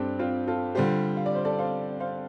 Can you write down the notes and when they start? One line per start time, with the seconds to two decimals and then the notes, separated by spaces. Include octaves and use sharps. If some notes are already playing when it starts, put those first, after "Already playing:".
Already playing: G2 C4 D4 G4 A4 G5
0.19 C4 F4
0.48 F4 A4
0.75 D3 G3 F4 G4 C5
1.17 F5
1.26 D5
1.35 C5
1.45 A4 D5
1.59 C5 F5
2.00 C5 F5